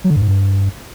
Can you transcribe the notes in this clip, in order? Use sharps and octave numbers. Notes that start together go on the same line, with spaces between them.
F#3
D3
G2
G#2
G2